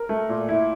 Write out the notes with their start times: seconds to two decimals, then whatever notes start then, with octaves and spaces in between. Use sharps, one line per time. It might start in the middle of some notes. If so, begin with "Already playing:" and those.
Already playing: A#4
0.09 A3
0.29 A#2
0.49 E4